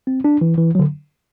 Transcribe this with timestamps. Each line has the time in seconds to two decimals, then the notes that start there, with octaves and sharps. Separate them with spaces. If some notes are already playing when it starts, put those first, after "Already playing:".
0.07 C4
0.25 D4
0.41 E3
0.58 E3
0.75 F#3
0.79 D3